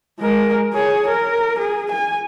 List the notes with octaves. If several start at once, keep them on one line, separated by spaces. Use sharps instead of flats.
G#3 A#4
G#4 C#5
A#4
G#4
G#5